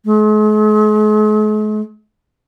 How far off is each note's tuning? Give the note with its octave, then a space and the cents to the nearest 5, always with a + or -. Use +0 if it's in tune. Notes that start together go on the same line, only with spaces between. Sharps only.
G#3 +45